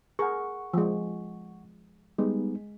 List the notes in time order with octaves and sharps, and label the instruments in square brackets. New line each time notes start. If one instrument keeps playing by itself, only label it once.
[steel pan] G#4 A#4 [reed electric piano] F#5 C#6
[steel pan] F3 G#3
[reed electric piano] G3 B3 D#4 [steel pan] G#3